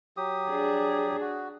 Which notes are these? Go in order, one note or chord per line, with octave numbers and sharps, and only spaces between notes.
F#3 G4 D#6
D4 G#4
F#4